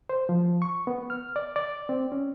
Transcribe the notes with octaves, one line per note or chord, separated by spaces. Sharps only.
C5
F3
C#6
B3
F6
D5
D5
C4
C#4